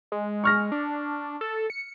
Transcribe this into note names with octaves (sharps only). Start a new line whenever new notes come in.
G#3
C#6 F6 A#6
D4
A4
C#7